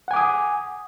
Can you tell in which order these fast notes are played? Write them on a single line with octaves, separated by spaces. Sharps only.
F#5 G#5 D6 D#6